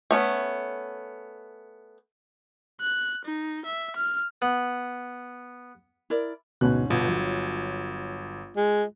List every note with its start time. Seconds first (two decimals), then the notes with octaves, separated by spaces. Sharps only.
0.11 A3 B3 C#4
2.81 F#6
3.25 D#4
3.65 E5
3.96 F6
4.42 B3
6.10 E4 A#4 D5
6.61 D2 G#2 B2 C#4 F#6
6.90 G1 B2 B3 F4
7.08 F#3
8.57 G#3